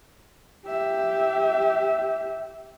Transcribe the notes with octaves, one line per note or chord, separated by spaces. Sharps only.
G4 E5